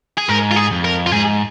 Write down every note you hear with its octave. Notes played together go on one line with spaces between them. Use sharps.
G#4
G#2 A#4
F4
G#4
F2
A#4
F4
G#2 G#4